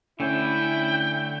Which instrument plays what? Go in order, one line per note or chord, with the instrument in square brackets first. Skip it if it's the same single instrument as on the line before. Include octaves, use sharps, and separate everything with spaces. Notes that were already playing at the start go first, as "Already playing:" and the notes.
[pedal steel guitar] D3 A3 [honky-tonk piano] C#4 [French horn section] E4 [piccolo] G5